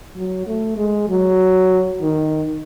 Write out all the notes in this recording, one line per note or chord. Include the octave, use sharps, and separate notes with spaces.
F#3
A3
G#3
F#3
D#3